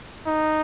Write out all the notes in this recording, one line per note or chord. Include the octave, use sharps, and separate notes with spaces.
D#4